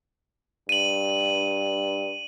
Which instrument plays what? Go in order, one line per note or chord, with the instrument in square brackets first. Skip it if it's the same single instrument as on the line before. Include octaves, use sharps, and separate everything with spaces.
[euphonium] G2 [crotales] D#7 F#7